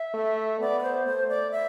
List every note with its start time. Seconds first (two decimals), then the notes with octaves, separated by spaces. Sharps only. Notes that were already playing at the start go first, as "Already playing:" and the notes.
Already playing: E5
0.14 A3
0.60 B3 D5
0.79 B4
0.82 C5
1.05 A3 C5
1.28 D5
1.51 E5